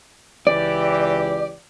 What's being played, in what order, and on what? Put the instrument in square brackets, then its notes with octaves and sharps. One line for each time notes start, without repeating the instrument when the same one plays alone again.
[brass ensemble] C#2 E3 G4 [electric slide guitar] D5